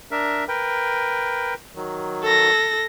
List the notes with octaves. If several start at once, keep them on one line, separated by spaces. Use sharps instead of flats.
D4 A#4 E5
A#4 B4 G5
D#3 F#3
A4 A#6